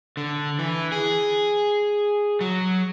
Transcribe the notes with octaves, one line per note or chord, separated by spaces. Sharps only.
D3
E3
G#4
F#3